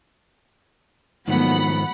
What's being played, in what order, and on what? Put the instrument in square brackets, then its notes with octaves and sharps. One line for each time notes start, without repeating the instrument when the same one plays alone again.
[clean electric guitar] G#2 D#3 F3 [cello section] F#3 A3 B3 [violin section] F#5 B5